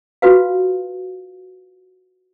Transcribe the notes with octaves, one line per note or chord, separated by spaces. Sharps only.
F4 F#4 B4 F5